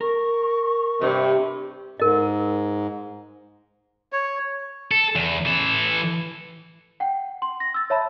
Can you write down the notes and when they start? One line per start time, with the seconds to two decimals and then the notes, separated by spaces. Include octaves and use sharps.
0.01 A#4 C#6
1.01 G2 C3
2.00 G#2 A#4 D#5
4.13 C#5
4.91 A4
5.16 E2
5.46 E3 A4
7.00 F#5 G5
7.42 C6
7.60 A#6
7.74 E6 A6
7.90 C#5 E5 A5 B5